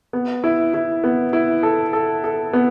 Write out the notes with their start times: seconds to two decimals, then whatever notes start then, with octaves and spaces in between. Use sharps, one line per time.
0.13 B3
0.44 E4
0.74 E4
1.04 B3
1.33 E4
1.63 A4
1.93 A4
2.24 A4
2.53 B3